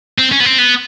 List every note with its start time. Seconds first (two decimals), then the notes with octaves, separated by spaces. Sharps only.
0.18 C4
0.32 C#4
0.40 B3
0.45 C4
0.58 B3